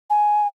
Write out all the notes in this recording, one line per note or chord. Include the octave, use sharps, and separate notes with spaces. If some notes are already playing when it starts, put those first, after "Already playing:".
G#5